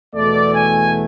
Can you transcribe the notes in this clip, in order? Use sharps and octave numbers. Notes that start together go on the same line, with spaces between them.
E2 B2 A3 D5
G#5